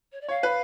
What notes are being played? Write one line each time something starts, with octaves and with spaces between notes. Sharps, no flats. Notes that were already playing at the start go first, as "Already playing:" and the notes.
C#5
D5
C#5 F5
B4